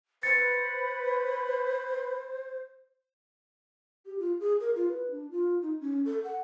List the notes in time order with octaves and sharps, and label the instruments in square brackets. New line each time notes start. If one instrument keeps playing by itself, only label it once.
[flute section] B4 B5 [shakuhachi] C5 [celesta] A6 C#7
[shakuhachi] G4
F4
G#4
A#4
F4
B4
D4
F4
D#4
C#4
A4
F#5